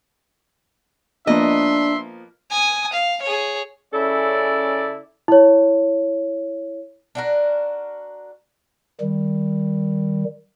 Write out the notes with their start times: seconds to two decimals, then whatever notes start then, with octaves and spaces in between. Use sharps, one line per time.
1.27 F3 A#3 B3 D4 D#5 E5 C6
2.51 G#5 D#6
2.93 F5
3.22 G#4 C#5
3.93 C#3 C#4 E4 A4 D5
5.28 E4 C#5
7.15 D4 F#4 A#4
9.00 D#3 G3